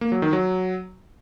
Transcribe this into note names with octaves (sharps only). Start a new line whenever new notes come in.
A#3
F#3
D#3
F#3